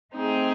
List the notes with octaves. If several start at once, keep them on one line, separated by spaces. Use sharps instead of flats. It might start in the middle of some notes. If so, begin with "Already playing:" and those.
A3 C4 D#4 G#4